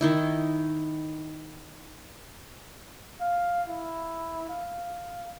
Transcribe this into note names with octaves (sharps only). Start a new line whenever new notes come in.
D#3 D#4 E4
F5
E4
F5